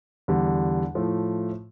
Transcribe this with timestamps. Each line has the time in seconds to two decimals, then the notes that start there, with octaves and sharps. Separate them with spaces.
0.28 E2 D3 G3
0.95 A2 F3 A3